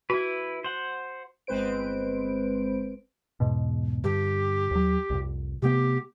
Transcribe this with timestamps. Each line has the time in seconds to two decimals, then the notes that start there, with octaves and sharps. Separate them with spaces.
0.10 E4 F#4 B4
0.64 C5 F#5
1.47 G1 G#3 C4 B4 C5 D7
3.40 E2 G#2 B2
4.04 G2 D3 G4
4.71 D#2 F#3
5.10 C2 F2
5.62 C3 A3 B3 G4